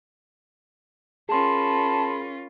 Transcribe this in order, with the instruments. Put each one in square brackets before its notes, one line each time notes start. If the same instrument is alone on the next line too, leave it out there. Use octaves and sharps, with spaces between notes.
[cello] C#4 F4 [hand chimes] G#4 C6 [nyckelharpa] A#4 B5 [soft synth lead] A5